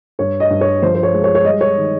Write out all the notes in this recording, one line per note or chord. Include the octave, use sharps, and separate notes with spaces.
G2 C#5
D#5
G2
C#5
F3 C5
C5
C#5
G#3
C#5
C#5
G3 D#5
C#5
D#3